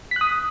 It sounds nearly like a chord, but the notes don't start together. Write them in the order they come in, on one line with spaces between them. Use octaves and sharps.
B6 F#6 D#6